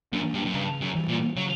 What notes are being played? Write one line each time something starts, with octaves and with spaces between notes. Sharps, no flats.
F#2 A#3 D4
G2
F#2
G2 C#3
F#2
E3 G3
A#2
C#3 F#3